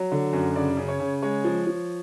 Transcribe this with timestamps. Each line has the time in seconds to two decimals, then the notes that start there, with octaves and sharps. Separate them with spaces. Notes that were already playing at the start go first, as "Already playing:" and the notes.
Already playing: F#3
0.12 D3
0.33 F#2
0.56 C#3 D5
0.77 C#3
0.88 C#5
1.00 C#3
1.23 G#3 C#5
1.45 F3
1.67 F3